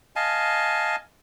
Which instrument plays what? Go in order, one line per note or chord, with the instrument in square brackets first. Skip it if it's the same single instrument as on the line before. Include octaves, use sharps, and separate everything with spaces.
[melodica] D#5 F5 G#5 A5